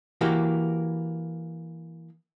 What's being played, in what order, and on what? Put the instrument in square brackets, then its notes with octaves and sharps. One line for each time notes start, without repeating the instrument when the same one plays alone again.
[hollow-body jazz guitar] E3 A#3 F#4 G4